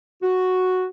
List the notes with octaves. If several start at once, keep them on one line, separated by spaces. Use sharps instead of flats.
F#4